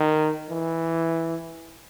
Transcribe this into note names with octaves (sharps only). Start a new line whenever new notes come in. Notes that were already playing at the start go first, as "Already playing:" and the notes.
Already playing: D#3
E3